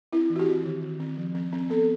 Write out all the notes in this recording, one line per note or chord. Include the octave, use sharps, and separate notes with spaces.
C4 E4
E3
F#4
G4
C4
D#3
D#3
C4
F3
C4
C4
B3 A4